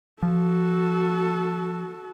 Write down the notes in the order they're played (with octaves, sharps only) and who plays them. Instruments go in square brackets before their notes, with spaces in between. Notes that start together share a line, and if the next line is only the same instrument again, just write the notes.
[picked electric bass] F3 [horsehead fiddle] F#4 A4